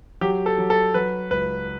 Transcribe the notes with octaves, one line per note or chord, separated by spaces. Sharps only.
F#3 G4
A4
F#3
A4
F#3 B4
C#2 B4